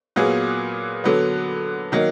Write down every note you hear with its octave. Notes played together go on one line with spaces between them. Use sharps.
A#2 F#3 B3 F4 G#4
D3 F#3 B3
D#3 F#3 A#3